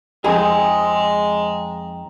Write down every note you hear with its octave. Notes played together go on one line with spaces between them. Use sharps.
F2 G#3 C4 D#4 G#4